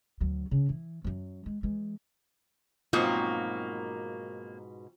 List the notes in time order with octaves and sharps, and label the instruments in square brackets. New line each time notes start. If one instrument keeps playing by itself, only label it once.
[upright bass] D2 F#3
C#3
E3
F#2 F#3
G#3
E3 G#3
[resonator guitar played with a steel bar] G#2 B2 [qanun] F#3 C4 F#4 [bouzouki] A#3 [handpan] F4